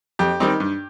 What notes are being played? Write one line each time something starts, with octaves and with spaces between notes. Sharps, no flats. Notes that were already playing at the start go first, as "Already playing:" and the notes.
F2 G4
D#3 G3 C4 D#4
G2